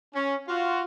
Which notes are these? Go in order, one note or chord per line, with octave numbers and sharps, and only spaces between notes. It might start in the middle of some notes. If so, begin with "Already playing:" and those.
C#4
F4 F#4